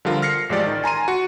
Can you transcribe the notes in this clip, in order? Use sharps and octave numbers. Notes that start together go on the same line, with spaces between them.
D3 F3 G3 F4 A#4
F6 A#6 C7 C#7
A1 F3 G#3 G4 D5 A6
D#3
G#5 A#5 C6 D#7
F#4 C#7